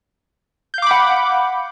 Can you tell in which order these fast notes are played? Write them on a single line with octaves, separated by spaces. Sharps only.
G6 F5 D6 B5 F#5